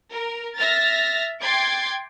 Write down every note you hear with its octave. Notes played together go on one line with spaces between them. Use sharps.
A#4
E5 F6 A6 A#6
G5 C6 D6 G#6 A6